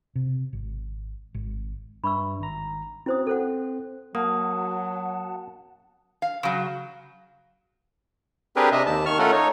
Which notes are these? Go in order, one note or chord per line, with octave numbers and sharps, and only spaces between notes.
C3
G#1
G#1
G2 E5 B5 C#6 E6
G#1 A#5
C4 C#4 E4 F#4 C5 D#6
C4 A4 C5 F#5 F#6
F#3 A#3 F#4 F#5 A5 D#6
F5
C#3 F#3 F5
C4 D4 G4 G#4 A#4 B4
C3 D4 D#5 E5
D#2 A5
D#3 C#6 F6
A3 C#4 F4 A4 A#4 F#5
D#4 C#5